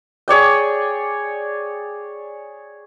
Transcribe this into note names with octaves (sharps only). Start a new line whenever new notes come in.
G#4 C#5 D5 G5